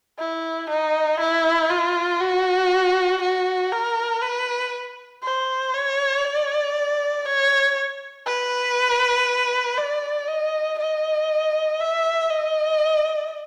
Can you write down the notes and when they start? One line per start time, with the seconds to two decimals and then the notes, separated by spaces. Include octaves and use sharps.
0.19 E4
0.69 D#4
1.20 E4
1.70 F4
2.21 F#4
3.22 F#4
3.72 A#4
4.22 B4
5.23 C5
5.74 C#5
6.24 D5
7.25 C#5
8.26 B4
9.78 D5
10.28 D#5
10.79 D#5
11.80 E5
12.30 D#5